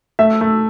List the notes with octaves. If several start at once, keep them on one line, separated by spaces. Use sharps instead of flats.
A3 E5
A3